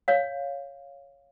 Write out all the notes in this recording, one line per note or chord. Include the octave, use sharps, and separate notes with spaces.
C#5 F5